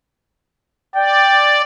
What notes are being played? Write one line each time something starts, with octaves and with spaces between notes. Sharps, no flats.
D5 G5